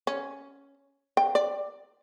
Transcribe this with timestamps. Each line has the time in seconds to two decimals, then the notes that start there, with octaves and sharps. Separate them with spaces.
0.07 C#4
1.17 G5
1.35 D5